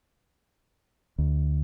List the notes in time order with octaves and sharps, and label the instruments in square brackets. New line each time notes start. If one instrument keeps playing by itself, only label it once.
[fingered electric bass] D2